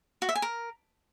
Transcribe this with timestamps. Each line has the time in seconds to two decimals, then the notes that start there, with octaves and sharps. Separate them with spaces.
0.22 F#4
0.29 E5
0.35 G#5
0.42 A#4